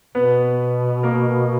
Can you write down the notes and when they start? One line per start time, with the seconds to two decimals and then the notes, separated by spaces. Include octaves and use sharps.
0.15 B2 B3 B4
1.03 A#3 A#4